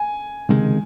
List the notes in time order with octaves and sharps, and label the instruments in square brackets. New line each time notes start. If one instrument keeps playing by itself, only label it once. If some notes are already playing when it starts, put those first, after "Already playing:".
Already playing: [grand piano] G#5
[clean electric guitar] C#2 C3 D#3 G#3